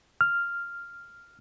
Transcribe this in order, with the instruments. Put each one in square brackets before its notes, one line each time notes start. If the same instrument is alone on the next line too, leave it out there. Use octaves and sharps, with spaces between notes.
[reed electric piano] F6